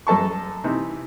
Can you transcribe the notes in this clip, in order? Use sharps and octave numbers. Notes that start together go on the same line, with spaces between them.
F#2 A4 A5 C#6
C3 E3 D#4